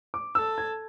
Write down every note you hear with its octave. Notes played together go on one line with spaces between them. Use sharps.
D6
A4 E6
G#6